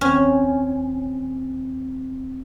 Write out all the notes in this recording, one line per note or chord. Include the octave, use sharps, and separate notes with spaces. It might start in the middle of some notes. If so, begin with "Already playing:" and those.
D#2 C4 C#4 G5